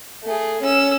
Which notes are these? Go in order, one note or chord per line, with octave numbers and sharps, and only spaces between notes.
A3 G#4
C#4 E6